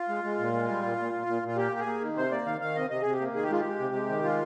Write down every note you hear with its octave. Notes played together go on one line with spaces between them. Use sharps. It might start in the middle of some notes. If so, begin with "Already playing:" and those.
Already playing: F4
G#3
G#3
A#2
G#3
G3
A#2
A#2
A#2
A#2
A#2
F4
A#3 G4
A#3
G#4
A#3
D#3
C3 C5
A#3 D5
D#3 F5
D#3 F5
C3 D#5
C3 D#5
C3 G#4
G4
A#3
D#3 G#4
G4
G#3 F4
G#3 G4
C3
G#3
D#3
G#3 F4